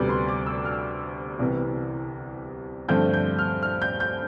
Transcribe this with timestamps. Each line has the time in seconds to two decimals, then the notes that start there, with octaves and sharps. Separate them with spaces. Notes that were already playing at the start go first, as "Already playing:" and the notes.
Already playing: D2 C3 G3 B3 D5
0.09 C6
0.28 D6
0.46 E6
0.65 F6
1.39 C2 C3 E3 B3
2.88 G2 D3 F3 A3 C4 G6
3.14 G6
3.39 F6
3.63 F6
3.82 G6
4.00 G6